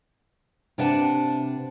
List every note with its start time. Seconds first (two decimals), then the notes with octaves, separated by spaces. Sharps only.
0.78 C3 D4 B4 E5 F#5 A5